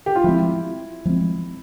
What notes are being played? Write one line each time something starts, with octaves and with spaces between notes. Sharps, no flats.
G4
F4
F3 G#3 C4 E4
F3 G#3 C4